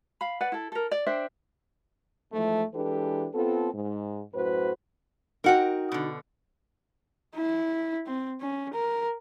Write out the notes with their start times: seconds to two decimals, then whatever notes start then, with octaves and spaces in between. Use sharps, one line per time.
0.21 F5 B5
0.41 B4 D5 F#5
0.52 E4 A4
0.72 A4 A#4
0.91 D5
1.07 D4 C5 E5 G5
2.33 G#2 E3 F3 A3
2.74 E3 G#3 D4 G4 A4 B4
3.34 B3 C4 F4 A4
3.73 G#2
4.33 F#2 A2 F#4 B4 C5
5.44 D#4 F#4 A#4 F#5 G5
5.92 B2 D3
7.35 E4
8.07 C4
8.41 C#4
8.74 A#4